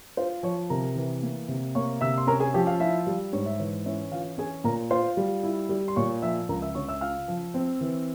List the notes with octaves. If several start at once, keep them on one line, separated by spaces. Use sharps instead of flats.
F4 C5
F3 C#5
C3 A#4 A#5
E3
A#3
C3
A#3 C#5 C#6
C3 E5 E6
C6
C#4 A#4 A#5
G#4 G#5
F3 G4 G5
F4 F5
E4 F4 E5
G3
G#2 C#5
E5
E3 C#5
C#4 E4 E5
E3 F4 F5
C#4 G#4 G#5
A#2 A#4 A#5
F4 C5 C6
G3
E4
G3
C6
A#2 C#5 C#6
F3 E5 E6
C#2 A#4 A#5
E5 E6
C#3 C#5 C#6
E5 E6
F4 F5 F6
F3
C4
E3